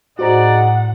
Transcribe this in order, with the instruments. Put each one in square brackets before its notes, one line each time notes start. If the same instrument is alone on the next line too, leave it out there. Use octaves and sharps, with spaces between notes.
[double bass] A2 [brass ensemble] D#4 G#4 D5 [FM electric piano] F#4 C5 A#5 [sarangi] F#5